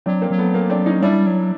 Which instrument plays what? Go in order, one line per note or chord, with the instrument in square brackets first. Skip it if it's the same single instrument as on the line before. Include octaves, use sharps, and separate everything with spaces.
[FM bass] F#3 [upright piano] C4 D4
[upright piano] A#3 C4
[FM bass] F#3
[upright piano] A3 B3
A#3 C4
C4 D4
C#4 D#4
[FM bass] G3 [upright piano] D4 E4
[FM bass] F#3